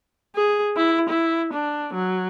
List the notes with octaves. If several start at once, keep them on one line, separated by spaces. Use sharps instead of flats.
G#4
E4
E4
D4
F#3